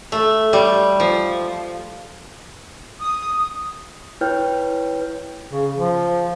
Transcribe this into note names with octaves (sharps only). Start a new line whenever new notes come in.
A3
G3
F3
D#6
E4 B4 C#5 G5 F6 G6
C#3
F3